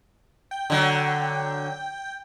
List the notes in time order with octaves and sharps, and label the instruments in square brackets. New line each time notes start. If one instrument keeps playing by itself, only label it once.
[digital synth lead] G5
[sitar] D3 F#3